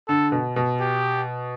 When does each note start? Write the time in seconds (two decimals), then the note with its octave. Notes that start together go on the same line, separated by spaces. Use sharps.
0.08 D3 A4
0.32 B2
0.56 B2
0.80 G4